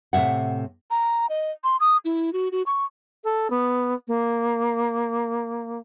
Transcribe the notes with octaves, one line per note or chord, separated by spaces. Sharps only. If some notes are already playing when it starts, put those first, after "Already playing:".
A2 C3 E5 F#5
A#5
D#5
C6
D#6
E4
F#4
F#4
C#6
A4
B3
A#3